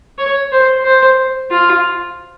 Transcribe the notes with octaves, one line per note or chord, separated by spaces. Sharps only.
C#5
C5
C5
F4